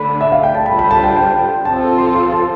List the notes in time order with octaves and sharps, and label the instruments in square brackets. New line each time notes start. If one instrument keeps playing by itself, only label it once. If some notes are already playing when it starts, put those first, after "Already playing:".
Already playing: [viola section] D3 A3 D4 [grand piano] B5
[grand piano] E5
F5
G5
A5
[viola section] D3 G3 D4 F4 C5 [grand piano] B5
[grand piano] B5
A5
G5
G5
[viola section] F3 C4 F4 A4 [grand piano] A5
[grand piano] C6
C6
A5